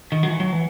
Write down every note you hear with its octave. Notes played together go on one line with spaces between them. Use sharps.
D#3
F#3
E3
F#3
E3